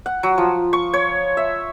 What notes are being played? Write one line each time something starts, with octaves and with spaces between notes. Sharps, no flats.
F#5
F#3
F3
C#6
C#5
E5